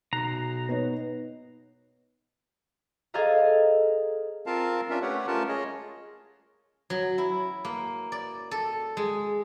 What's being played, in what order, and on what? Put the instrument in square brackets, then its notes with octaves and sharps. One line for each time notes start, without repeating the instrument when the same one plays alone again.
[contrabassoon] B1 [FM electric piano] B2 F#6 C7 [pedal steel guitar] A#5
[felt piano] B3 D#4 C#5
[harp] G#4 A4 C5 D#5 F5 A#5
[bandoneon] C4 F4 A#4 F5 A5
C#4 D4 F4 A#4 E5
A3 G4 B4 C#5 F#5
A3 C#4 F4 A#4 A5
G#4 C#5 D#5
[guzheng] F#3
E4
A#3
D5
A4
G#3